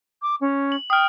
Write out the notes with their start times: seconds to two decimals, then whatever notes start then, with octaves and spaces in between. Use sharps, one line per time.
0.22 D6
0.41 C#4
0.72 F#7
0.90 G5 D#6 F6